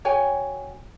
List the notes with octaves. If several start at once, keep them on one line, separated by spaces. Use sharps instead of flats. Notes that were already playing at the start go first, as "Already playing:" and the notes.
F#4 C#5 G5 G#5